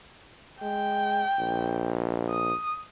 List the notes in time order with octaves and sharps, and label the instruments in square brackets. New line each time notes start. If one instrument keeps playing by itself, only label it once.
[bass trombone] G#3 [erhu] G5
[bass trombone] A#1
[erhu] D#6